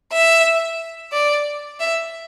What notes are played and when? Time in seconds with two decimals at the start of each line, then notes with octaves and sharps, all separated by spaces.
0.12 E5
1.13 D5
1.80 E5